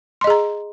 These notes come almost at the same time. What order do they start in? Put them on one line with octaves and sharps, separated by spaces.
C6 D#5 G#4 A#5